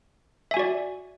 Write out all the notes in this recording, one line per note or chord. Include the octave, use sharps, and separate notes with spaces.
F#4 D5 E5 G#5